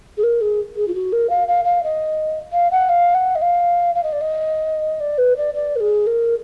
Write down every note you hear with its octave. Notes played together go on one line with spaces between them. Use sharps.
G#4
A#4
G#4
G#4
F4
F#4
A#4
F5
F5
F5
D#5
F5
F#5
F5
F#5
D#5
F5
F5
D#5
D5
D#5
D5
B4
D5
D5
A#4
G#4
A#4